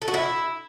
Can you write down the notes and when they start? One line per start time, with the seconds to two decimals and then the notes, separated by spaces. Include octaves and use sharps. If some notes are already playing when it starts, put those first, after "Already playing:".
0.02 A4
0.08 F#4
0.14 E4